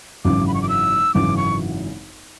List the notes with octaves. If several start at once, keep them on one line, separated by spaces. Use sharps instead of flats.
G#1 F#2 C#3 E3 D6
B5
C#6
D6
E6
G#1 F#2 C#3 E3 D6
C#6